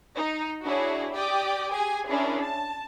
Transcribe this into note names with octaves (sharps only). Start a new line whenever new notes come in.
D#4
D4 E4 F#4 G#4 C#5
G4 D5 G5 D6 D#6
G4 G#4 G#5
C#4 D4 E4 G#4 A#4
A5